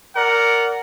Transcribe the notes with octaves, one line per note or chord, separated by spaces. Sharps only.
A#4 D5 F#5